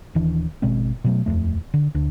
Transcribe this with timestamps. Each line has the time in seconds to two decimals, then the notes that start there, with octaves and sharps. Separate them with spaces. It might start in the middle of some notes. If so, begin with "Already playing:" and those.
0.15 D#1 D#3 E3 D4
0.62 G#1 B2 G#3 C4
1.04 B2 F#3 A3
1.26 D#1 G#1 F2 A3
1.74 D3
1.95 D2 D4